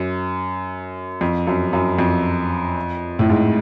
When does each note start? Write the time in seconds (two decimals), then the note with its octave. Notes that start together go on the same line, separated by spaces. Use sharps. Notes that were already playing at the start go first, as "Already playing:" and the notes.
Already playing: F#2
1.21 F2
1.47 F#2
1.73 F#2
1.99 F2
3.19 A2
3.30 G#2